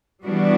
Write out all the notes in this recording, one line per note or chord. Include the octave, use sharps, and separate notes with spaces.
E3 G3 B3 D4 F#4